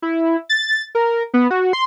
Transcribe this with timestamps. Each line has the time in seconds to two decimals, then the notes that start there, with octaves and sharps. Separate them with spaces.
0.02 E4
0.49 A6
0.95 A#4
1.34 B3
1.51 F#4
1.73 C6